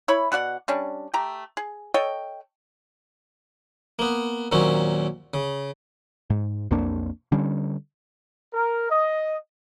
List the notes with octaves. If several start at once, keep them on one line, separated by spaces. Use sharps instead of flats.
E4 C#5 B5
B2 F#4 D5 F#5
G3 C#4 D4
A3 G4 A#5
G#4
A4 C#5 D#5 G5
A#3 B3
D#2 A#2 F#3 C4 C#4
C#3
G#2
B1 F2 A#3 D4
D3 G3 C#4
A#4
D#5